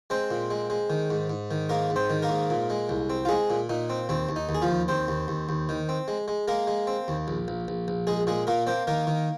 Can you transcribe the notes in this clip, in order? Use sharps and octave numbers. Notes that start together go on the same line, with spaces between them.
G#3 C4 C5
A#2
G#3
G#3
D#3
G#2
G#2
D#3
G#2 A#3 A#4
G#2
C4 C5
D#3
A#3 A#4
G#2
A#2
G#3
C2
C4
F4
G#3 G#4
A#2
A#2 D#4
C4
D#2 C4
D#2
D#4
D#2
G#4
F3 F4
D#2
D#2 C4 C5
D#2
D#2
D#2
D#3
C4
G#3
G#3
G#3 A#3 A#4
G#3
C4
D#2
A#1
A#1
A#1
A#1
A#1 G#3 G#4
A#2 G#3 G#4
A#2 A#3 A#4
A#3 C4 C5
D#3 A#3 A#4
D#3